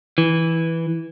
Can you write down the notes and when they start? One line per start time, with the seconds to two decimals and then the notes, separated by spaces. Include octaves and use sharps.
0.18 E3